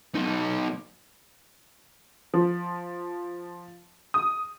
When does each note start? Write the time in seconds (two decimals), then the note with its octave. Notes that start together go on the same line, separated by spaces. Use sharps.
0.15 B1 D#4
2.34 F3
4.14 D#6